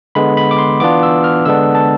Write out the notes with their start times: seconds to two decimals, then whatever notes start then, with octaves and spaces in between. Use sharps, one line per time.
0.15 D3 G#3 B3 B5
0.37 B5
0.51 D6
0.58 C6
0.80 E3 B3 D4 F4 D6
1.03 E6
1.24 F6
1.45 D3 G#3 B3 D4 E6
1.75 A5